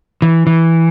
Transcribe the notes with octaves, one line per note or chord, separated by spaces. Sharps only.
E3
E3